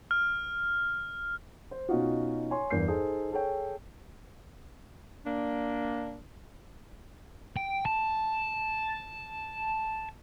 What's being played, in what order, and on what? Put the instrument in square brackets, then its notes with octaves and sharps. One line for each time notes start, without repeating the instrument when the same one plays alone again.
[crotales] F6
[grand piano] C5
B2 C#4 D#4 F4 F#4
C#5 G#5 C6
E2 G2 A#4 G6 C7
D#4 G#4 A4 C5
G#4 A4 C#5 G5
[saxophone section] A#3 D4
[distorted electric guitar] G5
A5